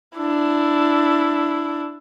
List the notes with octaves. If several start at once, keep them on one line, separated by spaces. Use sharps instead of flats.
D4 E4